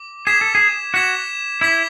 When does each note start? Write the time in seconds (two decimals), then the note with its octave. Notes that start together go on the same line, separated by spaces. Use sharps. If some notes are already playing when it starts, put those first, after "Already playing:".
Already playing: D6
0.27 G#4 D6 G#6 B6 E7
0.41 A4
0.55 G#4
0.94 F#4 D6 G#6 B6 E7
1.61 E4 D6 G#6 B6 E7